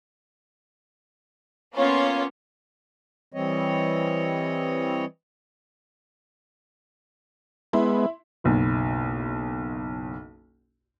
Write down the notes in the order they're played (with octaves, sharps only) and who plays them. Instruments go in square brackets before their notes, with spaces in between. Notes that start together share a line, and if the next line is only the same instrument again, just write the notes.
[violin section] A#3 B3 C#4 F4 C#5
[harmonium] E3 G3 C4 C#5 D#5
[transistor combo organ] G#3 B3 [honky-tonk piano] E4 C6
[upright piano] F#1 B1